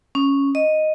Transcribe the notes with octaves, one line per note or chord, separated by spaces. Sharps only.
C#4
D#5